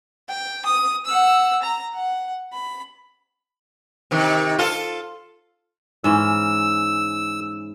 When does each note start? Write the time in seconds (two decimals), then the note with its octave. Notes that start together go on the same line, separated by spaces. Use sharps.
0.28 G5
0.65 D#6
1.06 F#5 E6
1.62 A#5
1.94 F#5
2.53 B5
4.11 C3 D#3
4.59 F4 A4
6.04 G#2 E3 C#4 E6